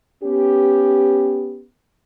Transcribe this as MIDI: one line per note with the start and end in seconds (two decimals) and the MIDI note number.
0.23 1.62 59
0.23 1.62 61
0.23 1.62 67